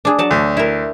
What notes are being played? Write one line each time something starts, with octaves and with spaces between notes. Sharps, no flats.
D4 G#4
F#3 F#5 A5
D2
E4 A#4